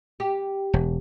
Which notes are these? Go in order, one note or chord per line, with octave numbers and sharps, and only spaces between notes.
G4
E1